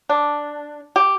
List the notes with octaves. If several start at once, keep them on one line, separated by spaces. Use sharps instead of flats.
D4
G4